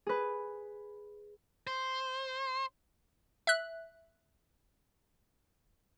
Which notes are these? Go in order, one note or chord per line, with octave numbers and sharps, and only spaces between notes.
G#4 B4
C5
E5 F#6